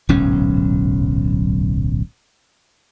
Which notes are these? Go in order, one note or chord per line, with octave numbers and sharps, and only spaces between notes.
D1 B1 G#2 C#4